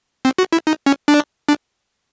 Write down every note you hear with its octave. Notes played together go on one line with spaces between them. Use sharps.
C4
F#4
E4
D#4
C#4
D4
D4